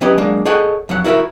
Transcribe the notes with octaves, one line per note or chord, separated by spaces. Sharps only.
E3 F#3 C#4 G4 B4 D#5
F#3 G#3 A#3 D4
G#4 A4 C#5 D#5 F#5 G5
F2 F#3 F#5
E4 F#4 A#4 C5 E5